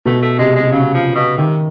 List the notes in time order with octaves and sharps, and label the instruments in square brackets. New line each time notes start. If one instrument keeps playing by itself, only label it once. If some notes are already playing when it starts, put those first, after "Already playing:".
[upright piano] B2 [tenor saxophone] A3
[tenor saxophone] A3
[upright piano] C3 [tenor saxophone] G#3
[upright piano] C3 [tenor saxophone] G#3
[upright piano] C#3 [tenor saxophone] F#3
[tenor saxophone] F3
B2
[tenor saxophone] C3 [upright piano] D#3